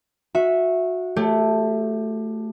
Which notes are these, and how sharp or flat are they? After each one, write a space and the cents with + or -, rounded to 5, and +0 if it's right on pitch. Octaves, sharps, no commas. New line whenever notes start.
F#4 -20 E5 +0
A3 +0 G4 +20 C#5 +0